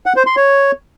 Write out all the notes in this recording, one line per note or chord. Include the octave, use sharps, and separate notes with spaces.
F#5
C5
C6
C#5